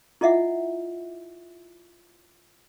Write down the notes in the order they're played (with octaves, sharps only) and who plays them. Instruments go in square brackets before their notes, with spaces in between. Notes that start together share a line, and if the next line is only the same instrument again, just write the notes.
[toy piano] E4 F4 D#5 E5 F#5